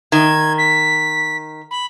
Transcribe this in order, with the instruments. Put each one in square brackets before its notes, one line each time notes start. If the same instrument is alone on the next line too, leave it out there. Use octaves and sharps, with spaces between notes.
[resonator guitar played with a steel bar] D#3 [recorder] G#6
[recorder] B6
B5